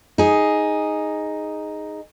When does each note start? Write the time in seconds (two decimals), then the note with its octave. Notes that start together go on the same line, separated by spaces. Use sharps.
0.18 D#4 G#4